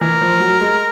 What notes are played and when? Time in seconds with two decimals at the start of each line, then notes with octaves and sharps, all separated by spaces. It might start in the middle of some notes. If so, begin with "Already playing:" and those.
0.01 E3 A#4
0.21 F3
0.40 F#3
0.60 G#3